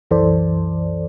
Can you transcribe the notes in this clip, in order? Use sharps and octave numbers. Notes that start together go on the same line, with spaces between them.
C2 F#2 E3 A4 C5 D5